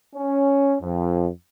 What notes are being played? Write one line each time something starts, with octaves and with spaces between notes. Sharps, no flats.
C#4
F2